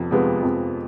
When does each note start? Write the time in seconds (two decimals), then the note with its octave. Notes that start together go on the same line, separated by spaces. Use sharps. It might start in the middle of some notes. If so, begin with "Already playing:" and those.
Already playing: F2 C3 F3 B3
0.11 C3 F3 G#3 B3
0.43 F2